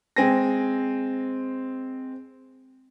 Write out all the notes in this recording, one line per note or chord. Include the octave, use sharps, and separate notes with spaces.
G#3 C4 G#5 A#6